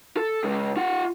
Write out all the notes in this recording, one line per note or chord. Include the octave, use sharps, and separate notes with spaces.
A4
C#3 G#3
F4 F#5